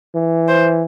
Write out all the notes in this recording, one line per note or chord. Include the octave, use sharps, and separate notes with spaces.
E3
C5